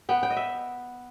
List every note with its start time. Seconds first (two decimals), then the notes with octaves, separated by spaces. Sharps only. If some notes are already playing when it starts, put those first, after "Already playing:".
0.09 B3 G5
0.23 G5
0.30 D#5
0.37 E5